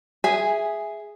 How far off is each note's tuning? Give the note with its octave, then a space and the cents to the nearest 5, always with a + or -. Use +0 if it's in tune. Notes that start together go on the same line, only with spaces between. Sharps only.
G#4 +0 E5 +0 G#5 -15